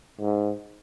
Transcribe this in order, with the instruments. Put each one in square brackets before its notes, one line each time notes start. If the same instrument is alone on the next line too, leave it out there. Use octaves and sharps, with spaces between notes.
[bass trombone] G#2